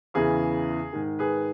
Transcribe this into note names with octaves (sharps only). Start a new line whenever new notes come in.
E2 C#3 E3 G#4
G#2 D#3
G#4 B4